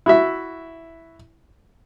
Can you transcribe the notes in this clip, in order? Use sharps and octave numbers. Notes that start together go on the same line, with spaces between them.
E4 F#4 E5